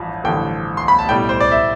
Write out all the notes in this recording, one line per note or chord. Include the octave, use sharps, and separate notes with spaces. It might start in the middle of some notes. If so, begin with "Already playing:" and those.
Already playing: A1 G2 F3
A1 G2 D3 F3 G5
C6
B5
A5
B1 A2 G3 G5
C5
D5
E5